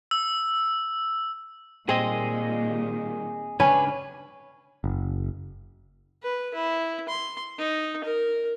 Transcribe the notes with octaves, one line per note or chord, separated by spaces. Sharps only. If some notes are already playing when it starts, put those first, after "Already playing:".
E6
A#2 D#3 G3 C4 G#4 D#5
C#3 G#3 C#4 D4 B4 G#5
F#1
B4
E4
C6
D#4
A#4